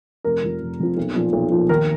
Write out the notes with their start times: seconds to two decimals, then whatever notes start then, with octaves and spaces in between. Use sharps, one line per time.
0.25 F1 A#4
0.44 F2 F3
0.61 F1
0.80 F2 F3
0.97 B1
1.15 A#2 F3
1.33 B1
1.52 A#2 F3
1.69 D#2 A#4